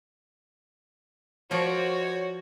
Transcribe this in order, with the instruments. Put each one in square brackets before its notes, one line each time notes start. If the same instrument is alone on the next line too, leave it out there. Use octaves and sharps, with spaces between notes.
[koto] F3 F4 D5 [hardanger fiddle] F#4 [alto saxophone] C#5